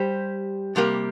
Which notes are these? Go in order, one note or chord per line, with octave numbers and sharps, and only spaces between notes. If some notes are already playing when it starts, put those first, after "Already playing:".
Already playing: G3 G4 C5
C3 G3 A#3 G4